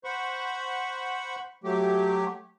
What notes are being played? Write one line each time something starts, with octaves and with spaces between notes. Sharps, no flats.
C5 F#5 B5 C#6
F#3 A3 G4